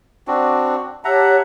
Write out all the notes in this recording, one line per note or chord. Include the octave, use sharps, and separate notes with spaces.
C4 D4 F#4
G4 C#5 E5 F#5 A5 A#5